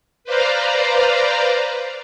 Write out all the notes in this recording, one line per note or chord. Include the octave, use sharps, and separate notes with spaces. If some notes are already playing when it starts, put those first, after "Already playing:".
B4 C5 D5 F5 A#5